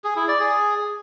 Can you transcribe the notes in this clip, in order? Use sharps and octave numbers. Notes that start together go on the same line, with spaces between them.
G#4
E4
D5
G#4